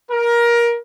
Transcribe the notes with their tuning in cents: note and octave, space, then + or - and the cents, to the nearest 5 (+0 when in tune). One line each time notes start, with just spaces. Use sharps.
A#4 +20